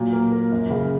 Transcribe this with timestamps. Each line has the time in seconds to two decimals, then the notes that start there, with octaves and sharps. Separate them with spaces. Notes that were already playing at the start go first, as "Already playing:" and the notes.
Already playing: A#2 F#3
0.13 A#3
0.32 A#4
0.51 F#2
0.70 C#3